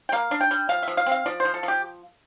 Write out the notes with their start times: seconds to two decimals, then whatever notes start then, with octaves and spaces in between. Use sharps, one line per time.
0.09 G5
0.12 A#3 F5
0.31 D4
0.41 G5
0.51 G3
0.69 F3 F5
0.83 E5
0.88 F3
0.97 F5
1.07 C4
1.12 F5
1.26 F3 D5
1.40 C5
1.45 F3
1.54 A4
1.63 F3
1.68 G4